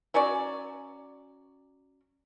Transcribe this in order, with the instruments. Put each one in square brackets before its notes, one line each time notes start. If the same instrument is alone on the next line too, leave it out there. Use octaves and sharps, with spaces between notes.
[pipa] F#3 C#4 F#4 D5